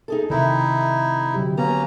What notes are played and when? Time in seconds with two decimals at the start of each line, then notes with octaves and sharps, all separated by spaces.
0.08 D#4 G#4 A4
0.30 F2 C3 D#3 D#4 E4
1.34 D3 F#3 G4
1.57 A#3 B3 C#4 A#5